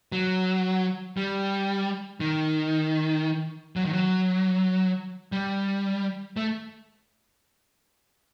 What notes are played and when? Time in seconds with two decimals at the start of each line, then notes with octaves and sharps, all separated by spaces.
0.12 F#3
1.17 G3
2.20 D#3
3.76 F#3
3.85 D#3
3.93 F#3
5.32 G3
6.37 A3